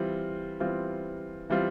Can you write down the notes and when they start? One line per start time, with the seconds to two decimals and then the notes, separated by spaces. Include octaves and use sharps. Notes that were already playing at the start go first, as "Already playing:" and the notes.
Already playing: E3 G3 C4 F4
0.60 E3 G3 C4 F4
1.50 E3 G3 C4 F4